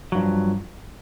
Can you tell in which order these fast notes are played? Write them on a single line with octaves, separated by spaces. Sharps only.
F#3 G2 F3